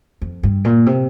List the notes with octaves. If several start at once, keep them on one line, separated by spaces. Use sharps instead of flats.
F2
G2
A#2
C3